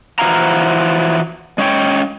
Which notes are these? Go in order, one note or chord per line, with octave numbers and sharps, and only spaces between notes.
E3 F3 E4 F#4 F5 A#5
G#3 C#4 C#5 G5